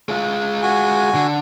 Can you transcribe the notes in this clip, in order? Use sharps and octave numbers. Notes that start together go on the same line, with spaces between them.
G#3 F4
F#4 G#5
D3